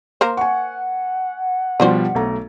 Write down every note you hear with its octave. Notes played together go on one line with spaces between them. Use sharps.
A#3 A#4 C5
F#5 G#5 C#6
B2 F3 G3 D4 F#4 C5
B1 A3 A#5